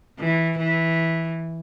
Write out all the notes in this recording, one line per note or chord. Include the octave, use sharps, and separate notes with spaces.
E3
E3